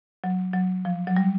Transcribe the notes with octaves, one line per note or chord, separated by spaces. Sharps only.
F#3
F#3
F3
F#3
G3